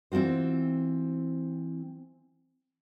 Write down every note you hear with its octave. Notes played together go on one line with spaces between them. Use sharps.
E3 C4 F4 F#4 C5